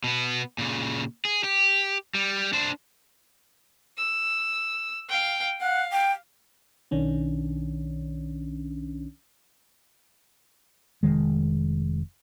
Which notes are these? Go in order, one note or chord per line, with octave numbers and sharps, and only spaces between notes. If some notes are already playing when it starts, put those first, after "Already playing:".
B2 B3
A#2 C#3
G#4
G4
G3
D4 C5
E6
F5 G5
F5 F#5
G5
B1 D#3 C#4 D4
F1 C#2 D#3 G#3